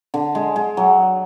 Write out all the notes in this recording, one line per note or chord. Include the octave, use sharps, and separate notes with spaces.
D3
G#3
G#3
F#3